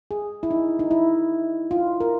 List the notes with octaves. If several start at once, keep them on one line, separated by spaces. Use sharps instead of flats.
G#4
E4
D#4
D#4
E4
F4
A#4